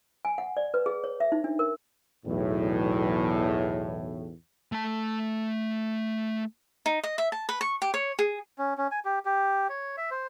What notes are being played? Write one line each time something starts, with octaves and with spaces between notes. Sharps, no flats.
G#5
F#5
D5
B4
G#4
C#5
E5
D#4
D4
A#4
B1 E2 A2
A3 A5
D#4
D#5
E5
A5
B4
C#6
G4
C#5
G#4
C#4
C#4
G#5
G4
G4
C#5
E5
C5